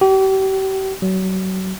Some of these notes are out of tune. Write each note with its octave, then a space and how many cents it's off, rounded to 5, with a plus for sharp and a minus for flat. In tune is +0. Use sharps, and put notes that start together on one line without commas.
G4 -40
F#3 +30